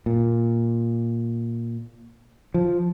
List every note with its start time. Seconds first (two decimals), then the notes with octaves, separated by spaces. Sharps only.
0.06 A#2
2.54 F3